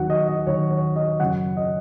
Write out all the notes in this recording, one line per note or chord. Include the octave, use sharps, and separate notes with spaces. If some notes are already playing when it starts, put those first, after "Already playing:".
Already playing: D#2 D#3 F#3 F#4 F#5
D#5
D#5
D#2 D#3 F#3 C#5
C#5
D#5
F#2 C#3 F#3 F#5
D#5